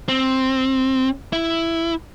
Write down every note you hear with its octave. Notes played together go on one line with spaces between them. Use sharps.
C4
E4